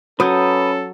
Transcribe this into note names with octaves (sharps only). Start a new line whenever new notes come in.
F#3 C#4 A4 B4 D#6 G6